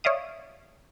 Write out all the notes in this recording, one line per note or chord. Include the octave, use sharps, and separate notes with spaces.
C#5 D5 E5 F5 D#6